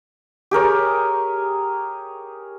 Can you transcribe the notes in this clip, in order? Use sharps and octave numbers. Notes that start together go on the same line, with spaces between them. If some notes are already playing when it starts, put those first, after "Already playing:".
G4 G#4 A#4 C#5